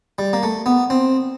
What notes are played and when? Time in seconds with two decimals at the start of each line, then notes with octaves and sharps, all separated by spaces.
0.19 G3
0.33 A#3
0.43 A3
0.66 B3
0.90 C4